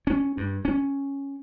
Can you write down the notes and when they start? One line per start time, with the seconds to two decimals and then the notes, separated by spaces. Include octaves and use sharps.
0.07 C#4
0.37 G2
0.65 C#4